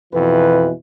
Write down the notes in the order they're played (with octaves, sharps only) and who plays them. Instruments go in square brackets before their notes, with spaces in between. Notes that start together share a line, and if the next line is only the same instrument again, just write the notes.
[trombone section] F2 B4 [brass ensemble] B2 E3